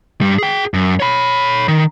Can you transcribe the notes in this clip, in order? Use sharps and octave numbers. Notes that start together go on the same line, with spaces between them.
G2 G3
G#4 G5
F#2
C#5 B5
D#3